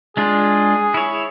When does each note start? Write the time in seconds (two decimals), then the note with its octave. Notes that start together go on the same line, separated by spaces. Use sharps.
0.17 G#3 D4 F4 G#4
0.94 E4 C#5